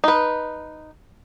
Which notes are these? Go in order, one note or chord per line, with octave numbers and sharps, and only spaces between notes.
D#4 B4